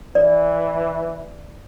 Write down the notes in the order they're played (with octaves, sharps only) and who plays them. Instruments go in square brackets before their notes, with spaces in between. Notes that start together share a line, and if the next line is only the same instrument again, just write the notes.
[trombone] E3 [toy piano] D5